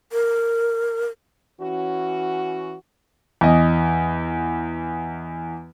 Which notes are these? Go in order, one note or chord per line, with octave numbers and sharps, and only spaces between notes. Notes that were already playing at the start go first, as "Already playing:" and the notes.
A#4
E3 C#4 F#4
E2 D#5